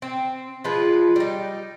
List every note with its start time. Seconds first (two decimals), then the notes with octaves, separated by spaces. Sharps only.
0.02 C4
0.64 F3 G#3 F4 B4
1.16 G3 D#4